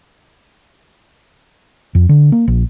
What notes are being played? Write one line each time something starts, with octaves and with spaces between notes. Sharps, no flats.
F2
D3
A#3
A#1